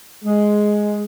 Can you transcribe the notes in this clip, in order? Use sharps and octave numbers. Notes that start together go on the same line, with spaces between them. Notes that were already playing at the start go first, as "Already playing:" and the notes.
G#3